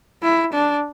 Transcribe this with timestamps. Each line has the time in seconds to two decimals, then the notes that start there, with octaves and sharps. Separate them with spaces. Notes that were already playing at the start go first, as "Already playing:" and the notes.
0.23 E4
0.53 D4